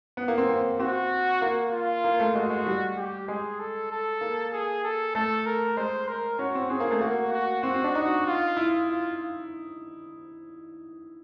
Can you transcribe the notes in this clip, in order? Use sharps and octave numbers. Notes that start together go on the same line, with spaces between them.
B3
A#3
C4
C4
C4 F#4
A#3
F4
A#3
A3
G#3 F#4
G#3
G3
G4
G#3 G#4
A4
A4
A#3
G#4
A4
A3 A4
A#4
G#3 C5
A#4
C#4 F#4
C4
C4 G#4
A#3
A3
A#3 F#4
F#4
C4 F#4
C4
D4
D#4 F#4
F4
E4
F4